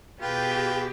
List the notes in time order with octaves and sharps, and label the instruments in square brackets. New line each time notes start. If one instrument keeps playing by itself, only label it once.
[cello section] B2 G4 G#4 [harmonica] F4 B4 G5